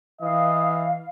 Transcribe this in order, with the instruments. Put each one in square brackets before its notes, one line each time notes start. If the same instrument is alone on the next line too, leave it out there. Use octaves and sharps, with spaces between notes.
[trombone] E3 [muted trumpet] D#5 [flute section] F5